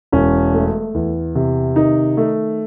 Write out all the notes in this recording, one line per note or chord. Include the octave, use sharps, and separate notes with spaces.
E1 C#4
A3
E2
C3
D#3 D#4
A3